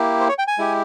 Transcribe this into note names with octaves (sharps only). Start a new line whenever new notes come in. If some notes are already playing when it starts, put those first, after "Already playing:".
Already playing: A#3 E4 G4
C5
C#5
G5
G#5
G#3 E4 G4